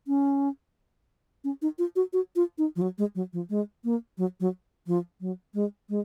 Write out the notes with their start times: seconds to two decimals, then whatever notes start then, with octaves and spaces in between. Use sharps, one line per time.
0.08 C#4
1.44 C#4
1.62 D#4
1.79 F4
1.96 F#4
2.13 F#4
2.36 F4
2.58 D#4
2.76 F3
2.82 F#3
2.98 G#3
3.15 F#3
3.33 F3
3.50 G#3
3.84 A#3
4.18 F#3
4.40 F#3
4.87 F3
5.21 F#3
5.54 G#3
5.90 G#3